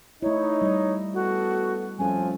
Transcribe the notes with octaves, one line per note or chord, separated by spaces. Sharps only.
A3 D#4 E4 C#5
G3 D#5
B3 F#4 A4
F2 F3 G3 A3 C#4 A4 G#5